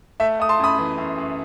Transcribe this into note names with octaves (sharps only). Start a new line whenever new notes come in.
A3 E5
A3 D#6
A5 C6
F#2 B5 D#6
E3
F#2
F#2